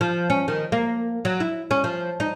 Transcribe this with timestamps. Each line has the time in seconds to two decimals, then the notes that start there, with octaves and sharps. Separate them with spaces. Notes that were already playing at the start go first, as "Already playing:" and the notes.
0.01 F3
0.30 C#4
0.48 D#3
0.72 A#3
1.25 F#3
1.40 E4
1.71 C#4
1.84 F3
2.20 D#4